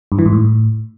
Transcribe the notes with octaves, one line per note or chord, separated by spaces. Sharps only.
G2
E3
G#2
A2